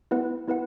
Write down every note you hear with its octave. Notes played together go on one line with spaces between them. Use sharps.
B3 E4 B4 F#5
B3 E4 B4 F#5